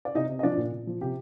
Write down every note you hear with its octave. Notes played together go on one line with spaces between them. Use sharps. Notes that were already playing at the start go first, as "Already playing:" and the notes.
D5
C3 D#4 D#5
C3
D#5
F3 D4 D5
A#2
A#2
F3
C3 G4